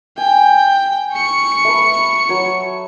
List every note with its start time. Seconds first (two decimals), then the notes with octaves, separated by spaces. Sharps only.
0.18 G5 G#5
1.13 C#6 C#7
1.65 A3 B4
2.29 F#3 C#5